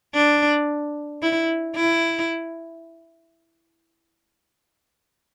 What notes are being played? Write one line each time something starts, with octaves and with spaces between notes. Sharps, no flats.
D4
E4
E4